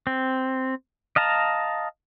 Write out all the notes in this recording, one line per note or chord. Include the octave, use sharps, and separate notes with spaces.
C4
D#5 F5 A5 A#5